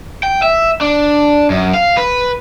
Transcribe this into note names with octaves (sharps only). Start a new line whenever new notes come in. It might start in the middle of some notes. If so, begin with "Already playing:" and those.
G5
E5
D4
F#2
F5
B4